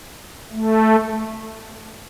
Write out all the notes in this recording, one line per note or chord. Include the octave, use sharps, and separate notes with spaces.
A3